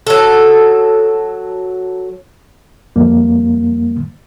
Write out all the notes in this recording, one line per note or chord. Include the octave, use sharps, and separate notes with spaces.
F#3 A4
F2 G3 A#3